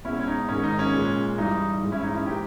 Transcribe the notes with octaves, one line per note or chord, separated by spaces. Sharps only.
B2 G#3 C#4 E4
C#4
D#4
G#2 D#3 G#3 C#4
D#4
C#4
A#2 G#3
G2 E3 G3 D#4
G#2 E3 G#3
C#4 E4
D#4
C#4 E4
E3 G#3 D#4 G4